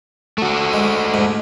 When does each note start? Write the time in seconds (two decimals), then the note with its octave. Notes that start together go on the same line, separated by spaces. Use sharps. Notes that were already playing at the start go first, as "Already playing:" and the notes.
0.38 A3 F#4
0.73 G#3
1.14 G#2